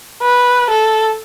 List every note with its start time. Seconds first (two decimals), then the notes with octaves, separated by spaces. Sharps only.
0.22 B4
0.70 A4